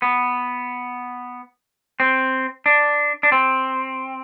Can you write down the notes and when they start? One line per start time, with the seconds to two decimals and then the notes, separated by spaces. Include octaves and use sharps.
0.02 B3
2.00 C4
2.66 D4
3.23 D4
3.32 C4